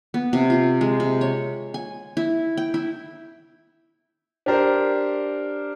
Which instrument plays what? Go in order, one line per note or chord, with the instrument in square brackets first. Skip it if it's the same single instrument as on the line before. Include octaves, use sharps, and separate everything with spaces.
[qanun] B3
C3
F4
G#3
C3
C#5
G#5
E4
G5
E4
[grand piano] D4 G4 A#4 C5